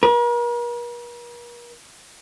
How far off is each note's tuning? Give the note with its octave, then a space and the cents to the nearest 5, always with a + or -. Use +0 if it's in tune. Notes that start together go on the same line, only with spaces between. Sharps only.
A#4 +45